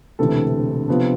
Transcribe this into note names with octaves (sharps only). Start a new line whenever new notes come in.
E1 D2 C3 E3 A4
C3 F3 B3 D4